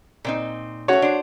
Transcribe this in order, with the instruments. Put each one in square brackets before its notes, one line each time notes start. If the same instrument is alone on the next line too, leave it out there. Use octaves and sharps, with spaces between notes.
[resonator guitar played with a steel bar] A#2 C4 D#4
[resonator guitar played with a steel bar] A3 C#4 [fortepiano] F#4 C#5
[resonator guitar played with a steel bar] D4 C5